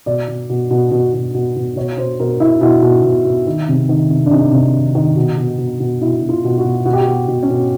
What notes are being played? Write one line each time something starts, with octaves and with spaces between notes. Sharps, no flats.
B2 D5
B2
B2
B2
B2
B2
B2
B2
B2 C#5
B2 C5
B2 A#4
B2 E4
B2 E4
B2
B2
B2
D#3
C3
D#3
C3
D4
C3 D#4
C3
D#3
D#3
B2
B2
B2
B2
B2 E4
B2
F4
B2
F#4
B2
B2 F#4
G4
F#4
B2
B2
C#4
B2